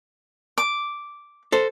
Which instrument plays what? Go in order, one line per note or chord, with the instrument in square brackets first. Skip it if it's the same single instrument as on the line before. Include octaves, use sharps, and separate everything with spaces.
[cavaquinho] D6
[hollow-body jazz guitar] A4 C5